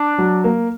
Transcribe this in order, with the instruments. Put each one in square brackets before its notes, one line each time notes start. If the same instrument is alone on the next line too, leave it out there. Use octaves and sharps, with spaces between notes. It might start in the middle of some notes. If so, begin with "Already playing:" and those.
Already playing: [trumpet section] D4
[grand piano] F#3
A#3